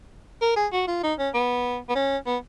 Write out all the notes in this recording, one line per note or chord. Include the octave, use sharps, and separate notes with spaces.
A#4
G#4
F#4
F4
D#4
C#4
B3
B3
C#4
B3